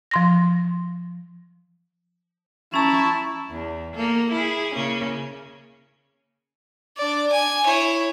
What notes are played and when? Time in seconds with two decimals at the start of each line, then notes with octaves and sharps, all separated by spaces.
0.11 F3 C6 A#6
2.74 C#4 E4 A5 A#5 C#6
3.50 E2
3.95 A#3 A4
4.32 E4 G#4
4.75 C#3 A#3 C#4
6.97 D4 D5
7.32 G#5
7.65 E4 C#5